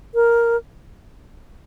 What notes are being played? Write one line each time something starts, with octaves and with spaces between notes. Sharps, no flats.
A#4